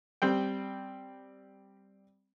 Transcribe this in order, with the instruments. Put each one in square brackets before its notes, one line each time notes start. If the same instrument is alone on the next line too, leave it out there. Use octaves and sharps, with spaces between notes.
[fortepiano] G3 C4 G5